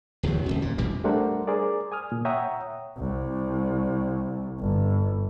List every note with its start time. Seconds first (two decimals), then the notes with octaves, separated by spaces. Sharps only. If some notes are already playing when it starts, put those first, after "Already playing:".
0.23 D1 E2 C3 F#3
0.46 D1 G#1 F#2
0.62 A#2
0.78 A1 E2 B2 G3
1.04 G3 A3 D4 A#4 C5 F#5
1.47 G#4 A#4 C5 D5
1.92 G#5 D#6 F6
2.12 A#2
2.25 C#5 E5 F#5 G5 A#5 D#6
2.97 C2
4.60 G1